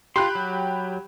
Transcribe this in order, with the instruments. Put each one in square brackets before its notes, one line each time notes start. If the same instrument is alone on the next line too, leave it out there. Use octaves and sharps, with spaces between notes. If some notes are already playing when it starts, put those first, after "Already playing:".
[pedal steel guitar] F4 C6 [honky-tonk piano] G4 B5 F#6
[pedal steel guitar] F#3